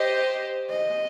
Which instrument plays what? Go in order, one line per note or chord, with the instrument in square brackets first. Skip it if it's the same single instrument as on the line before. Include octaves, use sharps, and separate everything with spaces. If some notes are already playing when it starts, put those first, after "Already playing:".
Already playing: [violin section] G4 C5 D#5
[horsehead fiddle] D#5